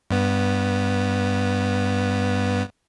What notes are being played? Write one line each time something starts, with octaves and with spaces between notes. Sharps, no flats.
G2 B3